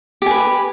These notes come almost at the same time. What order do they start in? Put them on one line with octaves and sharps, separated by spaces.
G4 G#5 B4